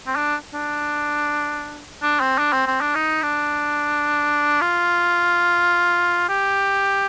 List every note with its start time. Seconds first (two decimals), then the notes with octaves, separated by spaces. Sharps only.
0.07 C4
0.16 D4
0.54 D4
2.03 D4
2.20 C4
2.38 D4
2.53 C4
2.67 C4
2.81 D4
2.95 D#4
3.23 D4
4.61 F4
6.29 G4